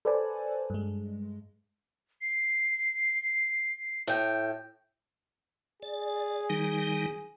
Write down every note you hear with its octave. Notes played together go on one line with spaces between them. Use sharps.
A4 B4 C5 D5 G#5 A5
G2 G#3
C7
A2 G5
G#4 D5
D#3 G3 D#4